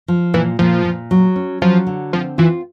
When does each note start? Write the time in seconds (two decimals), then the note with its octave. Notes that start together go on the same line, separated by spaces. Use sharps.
0.08 F3
0.34 A#2 E3
0.59 A#2 F3
0.85 A#2
1.11 F#3
1.36 C#4
1.62 F3 F#3
1.87 D3
2.13 F3 C4
2.38 E3 F4